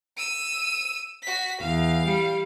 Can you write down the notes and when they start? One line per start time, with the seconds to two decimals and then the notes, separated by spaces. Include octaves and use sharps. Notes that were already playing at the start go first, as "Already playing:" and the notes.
0.17 E6 D#7
1.22 F#4 B6
1.61 E2 F5
2.06 G3